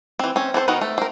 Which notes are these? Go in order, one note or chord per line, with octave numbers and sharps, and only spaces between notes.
E3 C4
C4 C#4
C4 A4 B4 C5
D#3 B3 D#4 F#4 A#4
A3
C4 A#4